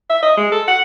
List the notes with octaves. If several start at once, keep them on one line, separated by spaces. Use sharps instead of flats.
E5
D#5
G#3
A4
F#5